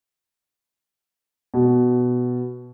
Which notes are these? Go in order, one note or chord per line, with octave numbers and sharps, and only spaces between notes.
B2